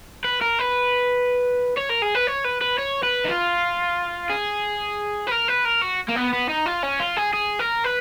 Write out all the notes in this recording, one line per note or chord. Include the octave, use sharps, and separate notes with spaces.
B4
A#4
B4
C#5
A#4
G#4
B4
C#5
B4
B4
C#5
B4
D#4
F4
G#4
B4
A#4
B4
A#4
F#4
A#3
B3
B3
D#4
F4
C#4
F4
G#4
G#4
A#4
B4